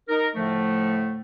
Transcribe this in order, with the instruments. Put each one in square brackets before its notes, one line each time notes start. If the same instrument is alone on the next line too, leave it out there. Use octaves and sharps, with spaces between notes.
[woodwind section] D#4 A#4
A2 D3 F3 A3